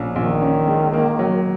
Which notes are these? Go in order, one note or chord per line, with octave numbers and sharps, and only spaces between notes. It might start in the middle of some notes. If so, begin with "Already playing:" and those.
Already playing: A#1 C#4
A#1 D#3
C#4
G#3
A#3
F#3